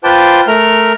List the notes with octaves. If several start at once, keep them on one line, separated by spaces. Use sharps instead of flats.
F4 B4 C5 G5 A5 D6
A3 A#4 F6